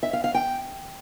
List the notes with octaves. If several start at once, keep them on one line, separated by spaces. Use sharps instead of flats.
E5
F5
F5
G5